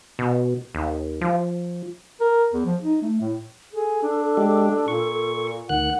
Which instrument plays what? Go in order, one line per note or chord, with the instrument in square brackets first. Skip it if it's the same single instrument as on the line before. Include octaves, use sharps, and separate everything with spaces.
[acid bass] B2
D#2
F3
[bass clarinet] A#4
E2
F3
D#4
A3
A2
[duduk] G#4 [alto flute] A4
[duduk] D4
[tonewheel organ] G#3 G4
[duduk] A#2 [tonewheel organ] C#6
[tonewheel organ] D2 D#3 F#6 [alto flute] F#5